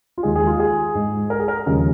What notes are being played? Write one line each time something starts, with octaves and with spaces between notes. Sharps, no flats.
F4
D#2 D#3 G#3 G#4
G#4
F4
G#4
G#2 G#3
A#4
G#4
A#4
D#2 C#3 F3 G#3 G#4